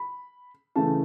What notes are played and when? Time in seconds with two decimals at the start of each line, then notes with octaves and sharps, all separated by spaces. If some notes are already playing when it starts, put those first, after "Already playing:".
Already playing: B5
0.76 C#3 E3 A3 A5